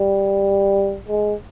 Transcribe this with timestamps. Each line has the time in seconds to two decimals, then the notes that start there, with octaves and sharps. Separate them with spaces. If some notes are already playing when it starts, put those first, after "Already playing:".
Already playing: G3
1.08 G#3